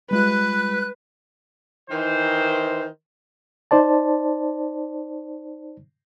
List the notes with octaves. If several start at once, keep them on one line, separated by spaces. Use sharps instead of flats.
G3 G#3 F4 B4 F#6
D#3 E3 C5
D#4 C5 D5 A5